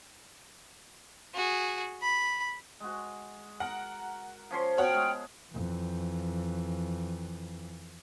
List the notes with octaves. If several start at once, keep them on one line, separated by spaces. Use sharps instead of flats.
F#4 G#4
B5
G#3 F#4
A#4 F#5
F3 C#4 C6
B3 F#4 C#5 F#5 G5 F6
G#3
F2 E3